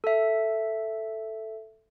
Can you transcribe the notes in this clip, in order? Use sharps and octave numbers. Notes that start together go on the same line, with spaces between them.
A4 E5